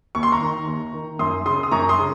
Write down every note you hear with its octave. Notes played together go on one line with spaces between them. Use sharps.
D#2 C#6
C6
A#5 C#6
D#3
D#2
D#3
F#2 C6 D#6
C#3 C6 D#6
D#6
F#2 A#5 C#6
C6 D#6
C#3